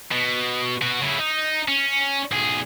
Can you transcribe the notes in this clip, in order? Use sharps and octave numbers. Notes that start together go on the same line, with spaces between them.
B2
B2 F#4
C#3 E4
D#4
C#4
B1 G#4